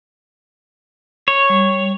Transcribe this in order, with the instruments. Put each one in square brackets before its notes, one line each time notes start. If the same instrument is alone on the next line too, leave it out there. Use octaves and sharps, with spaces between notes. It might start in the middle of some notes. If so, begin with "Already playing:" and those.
[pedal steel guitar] C#5
[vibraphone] G3